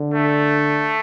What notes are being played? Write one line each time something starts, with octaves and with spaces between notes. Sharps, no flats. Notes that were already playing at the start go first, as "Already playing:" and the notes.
Already playing: D3
A3